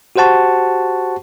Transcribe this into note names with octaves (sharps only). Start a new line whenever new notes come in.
F#4 G4 C5 F#5 A5 C#6